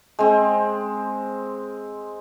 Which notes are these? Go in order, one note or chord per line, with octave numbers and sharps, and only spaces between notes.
G#3 C4